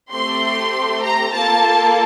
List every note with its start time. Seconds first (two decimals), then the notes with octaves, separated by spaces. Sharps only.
0.11 A3 C4 G4 C6
1.02 A#5
1.33 A#3 F4 A4 A5